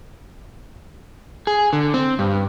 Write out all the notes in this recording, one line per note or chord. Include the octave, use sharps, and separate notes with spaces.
G#4
D3
C4
G2